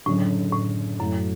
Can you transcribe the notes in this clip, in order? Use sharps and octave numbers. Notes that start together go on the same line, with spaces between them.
F#1 F#2 A2 D3
A2
F#2 A2 F#3 A3